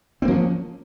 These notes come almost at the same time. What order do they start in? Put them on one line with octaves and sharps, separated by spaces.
C4 A#3 F3 C#4